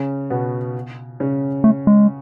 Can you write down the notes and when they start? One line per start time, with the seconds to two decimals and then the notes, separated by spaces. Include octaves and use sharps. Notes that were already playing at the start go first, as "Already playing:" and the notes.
Already playing: C#3 C#4
0.30 B2 B3
1.20 C#3 C#4
1.64 A3
1.87 G#3